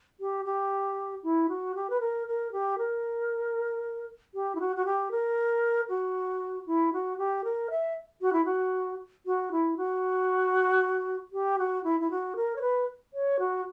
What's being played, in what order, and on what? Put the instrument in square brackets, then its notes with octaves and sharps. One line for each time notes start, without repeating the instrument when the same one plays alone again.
[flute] G4
G4
E4
F#4
G4
B4
A#4
A#4
G4
A#4
G4
E4
F#4
F#4
G4
A#4
F#4
E4
F#4
G4
A#4
E5
F#4
E4
F#4
F#4
E4
F#4
G4
F#4
E4
E4
F#4
A#4
C#5
B4
C#5
F#4